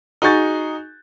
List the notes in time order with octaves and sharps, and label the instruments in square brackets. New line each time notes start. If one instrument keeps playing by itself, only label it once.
[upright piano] D#4 F#4 G#4 C#6 G6 A6